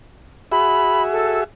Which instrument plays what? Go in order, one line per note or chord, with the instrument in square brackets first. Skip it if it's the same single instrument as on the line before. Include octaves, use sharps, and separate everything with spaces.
[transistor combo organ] F#4 G#4 E5 [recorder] B5
[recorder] A4